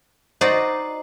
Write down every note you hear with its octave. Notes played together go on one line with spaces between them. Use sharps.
D#4 F#4 C5 D5 D#5